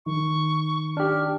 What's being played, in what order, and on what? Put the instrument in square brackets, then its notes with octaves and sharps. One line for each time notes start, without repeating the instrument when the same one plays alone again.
[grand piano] D#3 [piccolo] C#6
[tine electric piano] D4 G4 [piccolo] F6